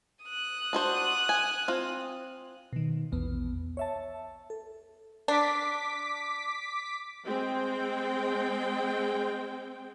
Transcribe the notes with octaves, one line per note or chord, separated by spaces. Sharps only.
D#6 F#6
D4 F#4 C5
G#5
C4 F4
B2 D#3
A#1 E2 B3
C#5 E5 A5
A4
D4 D6 B6
G#3 C4 G5